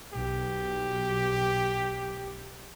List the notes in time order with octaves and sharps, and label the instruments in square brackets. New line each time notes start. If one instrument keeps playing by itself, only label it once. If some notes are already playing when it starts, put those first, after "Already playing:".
[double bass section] B1 [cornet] G4